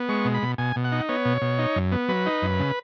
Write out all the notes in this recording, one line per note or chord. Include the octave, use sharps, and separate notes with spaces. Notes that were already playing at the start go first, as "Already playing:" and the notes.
Already playing: B3
G#3 C#6
B2
B5
B2
B2 G#5
B2
F#5
D#4
B3 C#5
B2
B2
D#4
F#2
B3
F#3 B4
D#4
F#2
C#3